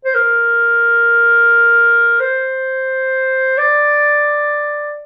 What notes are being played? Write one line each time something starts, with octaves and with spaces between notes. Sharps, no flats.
C5
A#4
C5
D5